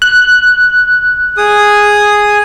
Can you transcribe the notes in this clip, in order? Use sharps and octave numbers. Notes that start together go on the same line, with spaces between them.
F#6
G#4 D#6